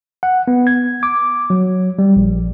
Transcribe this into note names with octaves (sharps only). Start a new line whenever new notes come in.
F#5
B3
G#6
D6
F#3
G3
A#1